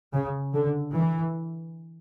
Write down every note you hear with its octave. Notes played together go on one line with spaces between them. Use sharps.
C#3
D3
E3